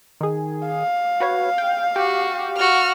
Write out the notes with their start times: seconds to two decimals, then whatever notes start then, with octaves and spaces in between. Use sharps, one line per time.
0.21 D#3 G#4
0.67 F5
1.20 F#4 B4 C#5
1.58 G5
1.96 F#4 G4
2.57 F#4 F6